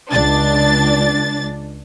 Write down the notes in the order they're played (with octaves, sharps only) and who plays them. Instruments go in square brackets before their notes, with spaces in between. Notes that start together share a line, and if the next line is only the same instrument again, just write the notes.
[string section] C#2 D4 A6